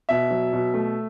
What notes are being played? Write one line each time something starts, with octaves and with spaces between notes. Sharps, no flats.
B2 E5
F#3
B2
A3